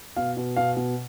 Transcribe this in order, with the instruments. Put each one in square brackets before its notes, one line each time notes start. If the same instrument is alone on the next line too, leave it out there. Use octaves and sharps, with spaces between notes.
[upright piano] B2 F5
B2
B2 F5
B2